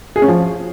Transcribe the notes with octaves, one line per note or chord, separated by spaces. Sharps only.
G#4
C#4
F3